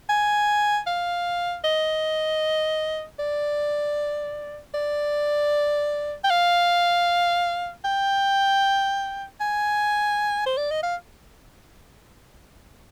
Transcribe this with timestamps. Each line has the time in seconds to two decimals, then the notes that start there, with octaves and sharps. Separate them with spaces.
0.09 G#5
0.87 F5
1.64 D#5
3.19 D5
4.74 D5
6.24 G5
6.30 F5
7.85 G5
9.40 G#5
10.46 C5
10.57 D5
10.71 D#5
10.83 F5